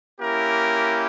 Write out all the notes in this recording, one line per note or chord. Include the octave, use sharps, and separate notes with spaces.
A#3 C#4 E4 G4 A#4